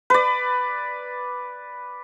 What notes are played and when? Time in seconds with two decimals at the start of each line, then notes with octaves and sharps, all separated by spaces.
0.10 B4 D5